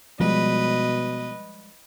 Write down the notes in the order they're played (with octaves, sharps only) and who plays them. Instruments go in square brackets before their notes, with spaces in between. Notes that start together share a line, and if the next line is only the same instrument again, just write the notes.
[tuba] B2 [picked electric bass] F3 G3 G#3 [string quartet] B4 D#5